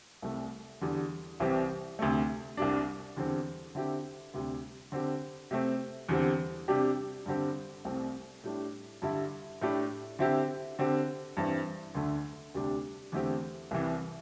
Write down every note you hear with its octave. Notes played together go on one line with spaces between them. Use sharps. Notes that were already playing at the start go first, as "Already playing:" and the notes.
C2 C3 A3
E2 D3 G3
C2 C3 E3 C4 G4
D2 C3 A3
C2 C3 G3 D4
E2 D3 G3 C4
D3 C4 E4 G4
D2 C3 G3
D3 C4 G4
C3 A3 C4
E2 D3 G3 C4
C3 G3 D4 G4
G2 D3 C4 G4
C2 C3 A3 C4
A2 G3 D4
G2 D3 G3 E4
A2 A3 D4 G4
D3 C4 E4 G4
D3 C4 G4
G2 E3 C4
D2 D3 A3
D2 C3 G3 D4 G4
E2 D3 A3 C4 G4
C2 C3 E3